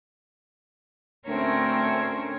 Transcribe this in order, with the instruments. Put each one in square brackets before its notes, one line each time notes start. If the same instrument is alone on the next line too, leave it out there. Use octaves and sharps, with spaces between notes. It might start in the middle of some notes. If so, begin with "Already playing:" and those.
[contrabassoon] D2 [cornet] A3 [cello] C4 A#4 [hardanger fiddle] C#4 C#5